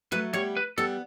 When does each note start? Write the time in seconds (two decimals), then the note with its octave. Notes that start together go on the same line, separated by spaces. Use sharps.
0.12 F#3 A3 B4
0.33 G3 B3 C#5
0.57 B4
0.78 G3 B3 A4